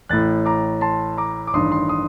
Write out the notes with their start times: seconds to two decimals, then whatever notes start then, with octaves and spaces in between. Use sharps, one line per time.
0.09 A1 A2 F#6 A6
0.46 A#5 D6
0.81 A5 C6
1.18 A#5 D6
1.47 D6
1.53 A1 G2 D#3 C6 D#6
1.71 C6 D#6
1.89 C6 D#6